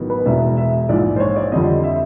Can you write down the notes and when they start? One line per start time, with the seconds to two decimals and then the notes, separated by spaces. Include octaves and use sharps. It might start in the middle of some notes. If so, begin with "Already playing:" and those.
Already playing: A1 D#3 F#3 B3
0.10 B4
0.26 E1 E2 B2 E5
0.57 E5
0.89 A#1 G#2 E3 D5
1.16 C5
1.20 C#5
1.36 D5
1.52 F2 D3 G3 C4 D#5
1.84 E5